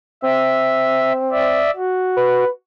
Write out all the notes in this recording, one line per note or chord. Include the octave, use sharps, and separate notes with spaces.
C4 E5
D5 E5
F#4
B4